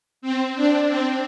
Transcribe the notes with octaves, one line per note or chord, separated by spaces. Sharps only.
C4
D4
C4